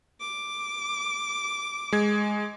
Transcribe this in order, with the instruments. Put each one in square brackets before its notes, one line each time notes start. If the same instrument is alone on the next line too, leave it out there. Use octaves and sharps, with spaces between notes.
[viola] D6
[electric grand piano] G#3 G#6